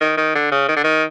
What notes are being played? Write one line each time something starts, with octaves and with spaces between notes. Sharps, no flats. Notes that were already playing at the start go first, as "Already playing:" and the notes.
D#3
D#3
D3
C#3
D#3
D3
D#3